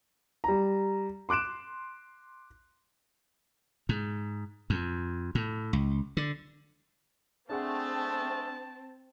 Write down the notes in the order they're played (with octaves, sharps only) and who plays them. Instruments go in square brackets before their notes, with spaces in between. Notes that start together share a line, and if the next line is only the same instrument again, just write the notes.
[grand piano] G3 A#5
C6 D6 F#6 D7 E7
[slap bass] G#2
F2
A2
C#2
D3
[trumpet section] G#3 A3 [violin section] C4 [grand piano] D4 G#4 F#5 [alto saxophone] A5